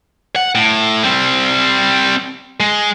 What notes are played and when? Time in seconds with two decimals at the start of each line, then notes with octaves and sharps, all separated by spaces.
0.36 F#5
0.55 A2
1.03 G3 C4
2.60 G#3